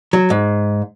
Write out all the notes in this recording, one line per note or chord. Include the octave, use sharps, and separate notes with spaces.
F#3
G#2